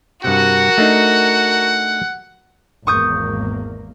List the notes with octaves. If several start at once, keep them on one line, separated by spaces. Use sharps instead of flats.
G2 C3 F#4 A#4 F#5
A3 D4 D#4
G#1 E2 A#3 C#6 D#6 G6